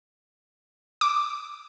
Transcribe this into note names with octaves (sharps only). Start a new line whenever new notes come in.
D6